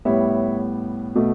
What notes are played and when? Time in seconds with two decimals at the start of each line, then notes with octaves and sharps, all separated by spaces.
0.05 A2 G3 B3 C#5 E5
1.15 B2 A3